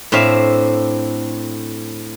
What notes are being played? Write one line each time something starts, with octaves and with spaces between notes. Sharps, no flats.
A2 C4 D4 E5 F5